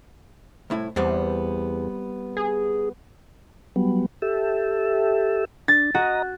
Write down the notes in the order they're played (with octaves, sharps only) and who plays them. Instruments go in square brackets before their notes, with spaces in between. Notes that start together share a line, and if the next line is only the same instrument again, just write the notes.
[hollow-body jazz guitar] C2 A2 E4
[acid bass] E2 [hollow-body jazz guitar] G3 B3 C4
[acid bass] G#4
[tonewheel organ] F#3 G3 B3
G4 A4 E5
[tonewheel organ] D4 [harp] A6
[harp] F#4 [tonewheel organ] D#5 A#5